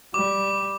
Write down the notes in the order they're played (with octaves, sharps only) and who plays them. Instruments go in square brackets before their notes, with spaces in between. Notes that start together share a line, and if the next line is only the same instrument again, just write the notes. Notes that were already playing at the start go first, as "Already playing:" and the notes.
[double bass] G3 [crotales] D6